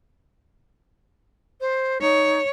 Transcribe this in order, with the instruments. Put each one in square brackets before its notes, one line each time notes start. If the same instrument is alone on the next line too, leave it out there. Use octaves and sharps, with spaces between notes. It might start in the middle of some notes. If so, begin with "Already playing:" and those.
[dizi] C5
[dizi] D#4 [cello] C#5